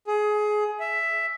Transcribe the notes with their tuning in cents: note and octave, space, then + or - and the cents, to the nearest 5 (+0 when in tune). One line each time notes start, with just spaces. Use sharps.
G#4 +20
E5 +5